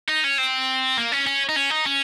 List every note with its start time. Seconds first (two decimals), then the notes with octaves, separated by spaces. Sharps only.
0.09 D#4
0.24 C#4
0.38 C4
0.98 A#3
1.12 C#4
1.27 C#4
1.49 D#4
1.56 C#4
1.70 D#4
1.86 C#4